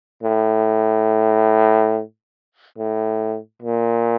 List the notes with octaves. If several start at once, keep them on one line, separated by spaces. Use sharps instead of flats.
A2
A2
A#2